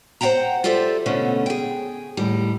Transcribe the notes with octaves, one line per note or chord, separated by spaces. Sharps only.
C5 D#5 F#5 G5 A#5
F4 G4 A4 C5 D5 E5
B2 D3 A3 C#4
G#4 G5
D#2 A2 G3